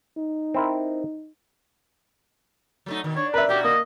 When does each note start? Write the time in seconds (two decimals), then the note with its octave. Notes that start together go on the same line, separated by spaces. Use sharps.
0.18 D#4
0.54 C4 E4 A#4
2.86 F#3 A3 D#4
3.04 B2 D#3
3.16 D4 C#5
3.34 A#4 B4 E5
3.49 B2 F#4 G4
3.65 A#3 D#5